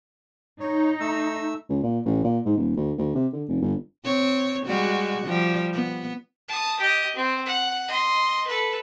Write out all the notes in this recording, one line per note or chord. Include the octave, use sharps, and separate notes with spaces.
D#4 C#5
A3 E6
C#2
A#2
A1
A#2
G#2
D#1
D2
D2
C3
D3
F1
G1
C4 C#5
G3 G#3 F#4
F3 G3 G4
B3
A5 D#6
G4 D#5
C4
F#5
D#5 C6
A4 B4